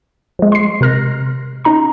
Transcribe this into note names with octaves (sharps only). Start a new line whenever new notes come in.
F3 G#3
C6 C7
C3 A#4 F6 A#6
C#4 D#4 A#5 C6